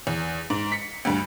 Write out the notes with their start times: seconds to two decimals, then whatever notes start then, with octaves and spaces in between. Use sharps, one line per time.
0.07 E2
0.50 G#2
0.72 B6 C#7
1.05 D2 G2